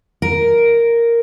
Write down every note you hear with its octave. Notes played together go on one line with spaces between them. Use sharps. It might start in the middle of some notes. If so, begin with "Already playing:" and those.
A#4